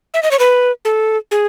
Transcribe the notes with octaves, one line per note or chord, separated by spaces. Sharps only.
E5
D#5
C#5
B4
A4
G#4